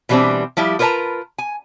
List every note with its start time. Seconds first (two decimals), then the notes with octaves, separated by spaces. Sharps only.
0.09 B2 E3 G3 A3 C4 D4
0.57 F3 G3 E4 G4
0.79 F4 A#4 B4 C#5 A5 A#5
1.38 G#5